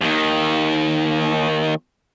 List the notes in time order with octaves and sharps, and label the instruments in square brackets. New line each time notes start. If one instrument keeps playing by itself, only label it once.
[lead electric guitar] D#2 D#3